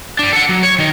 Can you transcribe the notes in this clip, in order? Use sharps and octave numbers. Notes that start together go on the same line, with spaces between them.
G3 D4
A4 F#5
F#3
C#5
D#3 D#4